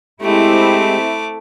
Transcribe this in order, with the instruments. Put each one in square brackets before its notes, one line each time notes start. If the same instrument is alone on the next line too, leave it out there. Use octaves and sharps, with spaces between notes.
[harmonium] G#3 G4 [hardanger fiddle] A3 D6 [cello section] C4 E4